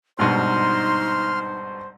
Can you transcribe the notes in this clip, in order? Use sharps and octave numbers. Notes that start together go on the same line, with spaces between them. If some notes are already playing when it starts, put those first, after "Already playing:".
G#1 G2 B2 D#4 C5 C6 F6